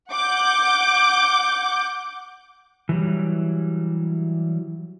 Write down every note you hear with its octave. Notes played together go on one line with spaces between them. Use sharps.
F#5 D6 G6
E3 F#3 G3